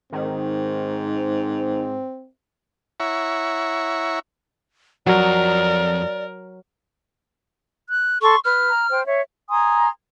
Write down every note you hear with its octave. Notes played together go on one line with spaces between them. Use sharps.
G#2 D#3 C4
E4 C#5 E5 F#5 A#5 C#6
F2 F#3 A#4 D5 F#5
F#6
A4 C6 C#6
B4 F6
A#5
C5 G5
C#5 E5
G#5 A#5 C6 D#6